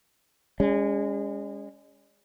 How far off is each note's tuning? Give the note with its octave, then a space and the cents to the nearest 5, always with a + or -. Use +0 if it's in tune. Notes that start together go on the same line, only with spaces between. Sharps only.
G#3 -30 C#4 +25